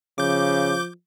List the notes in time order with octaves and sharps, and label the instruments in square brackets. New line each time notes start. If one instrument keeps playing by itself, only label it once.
[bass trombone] C#3 [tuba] F3 [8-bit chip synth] D6 G6